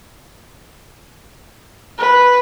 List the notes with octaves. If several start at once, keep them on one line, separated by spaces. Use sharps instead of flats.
B4